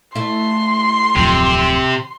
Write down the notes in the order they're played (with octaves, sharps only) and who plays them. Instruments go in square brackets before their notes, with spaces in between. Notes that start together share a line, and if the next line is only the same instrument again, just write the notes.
[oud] A3 E4 [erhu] C6
[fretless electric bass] D1 F2 [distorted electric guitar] C3